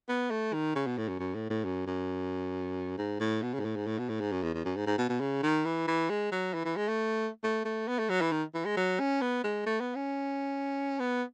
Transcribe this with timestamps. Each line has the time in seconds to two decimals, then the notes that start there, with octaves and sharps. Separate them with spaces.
0.09 B3
0.31 A3
0.53 D#3
0.76 C#3
0.87 B2
0.98 A2
1.08 F#2
1.20 F#2
1.35 A2
1.50 A2
1.64 F#2
1.87 F#2
2.98 G#2
3.20 A2
3.42 B2
3.54 C#3
3.60 G#2
3.65 A2
3.76 G#2
3.87 A2
3.98 B2
4.09 A2
4.20 G#2
4.32 F#2
4.43 E2
4.54 E2
4.65 F#2
4.76 G#2
4.87 G#2
4.98 B2
5.09 B2
5.20 C#3
5.43 D#3
5.65 E3
5.87 E3
6.10 G#3
6.32 F#3
6.54 E3
6.65 E3
6.76 G#3
6.88 A3
7.43 A3
7.65 A3
7.88 B3
7.99 A3
8.10 F#3
8.21 E3
8.32 D#3
8.54 E3
8.65 G#3
8.77 F#3
8.99 C#4
9.21 B3
9.44 G#3
9.66 A3
9.80 B3
9.95 C#4
10.99 B3